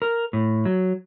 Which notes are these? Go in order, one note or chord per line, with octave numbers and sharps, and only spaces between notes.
A#4
A2
F#3